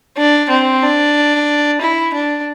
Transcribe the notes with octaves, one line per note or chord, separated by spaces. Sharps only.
D4
C4
D4
E4
D4